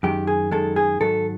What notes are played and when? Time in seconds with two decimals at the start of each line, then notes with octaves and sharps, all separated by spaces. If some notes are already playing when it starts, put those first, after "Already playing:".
0.03 F#2 D#3 G#3 G4
0.27 G#4
0.51 F#2 D#3 G#3 A4
0.76 G#4
1.00 G#2 D#3 F#3 A4